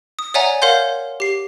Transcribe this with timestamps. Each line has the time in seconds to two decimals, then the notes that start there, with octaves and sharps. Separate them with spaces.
0.19 D#6
0.34 C#5 D5 E5 F#5 G#5 A#5
0.62 A#4 C#5 F5 F#5 C6 G6
1.20 G4 C7